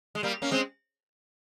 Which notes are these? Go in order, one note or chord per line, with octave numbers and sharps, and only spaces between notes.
G#3
G3 A#3
A#3 C#4
G#3 C4